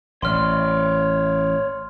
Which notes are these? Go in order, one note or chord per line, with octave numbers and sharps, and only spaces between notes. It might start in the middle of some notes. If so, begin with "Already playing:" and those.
A1 C#5 D5 C6 F6